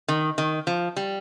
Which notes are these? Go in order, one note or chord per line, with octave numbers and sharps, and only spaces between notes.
D#3
D#3
F3
G3